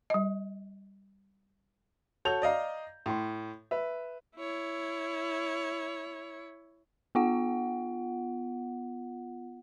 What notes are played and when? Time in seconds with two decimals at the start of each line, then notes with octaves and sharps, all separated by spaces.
0.10 G3 D#5
2.25 F#4 A4 C#5 G6 F7
2.42 D5 D#5 F5 A#5
3.06 A2 C6
3.71 B4 E5
4.36 E4 C#5
7.15 B3 F4 F#5